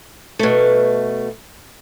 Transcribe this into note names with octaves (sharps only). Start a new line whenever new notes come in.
B2 A3